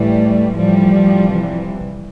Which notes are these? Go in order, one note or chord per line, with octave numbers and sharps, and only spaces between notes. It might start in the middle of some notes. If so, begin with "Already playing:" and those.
Already playing: A2 E3 G3 A3
A2 E3 F3 G3
C3 E3